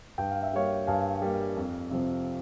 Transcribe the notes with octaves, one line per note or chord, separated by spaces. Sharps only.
G2 G5
F5
E5
G3 A#3 C#5 F5
G2 F5 G#5
G3 A#3
F2
C3 F3 C4